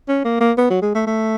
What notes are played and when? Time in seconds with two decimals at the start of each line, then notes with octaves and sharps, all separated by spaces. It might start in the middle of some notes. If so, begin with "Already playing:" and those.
0.09 C#4
0.25 A#3
0.41 A#3
0.58 B3
0.70 F#3
0.82 G#3
0.95 A3
1.07 A3